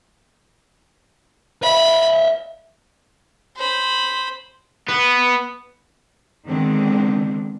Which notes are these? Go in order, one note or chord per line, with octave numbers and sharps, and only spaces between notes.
D#5 E5 B5
C5 B5
B3
D3 D#3 G#3 B3 C4 D4